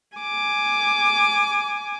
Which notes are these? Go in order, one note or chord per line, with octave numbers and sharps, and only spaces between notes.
G#5 D6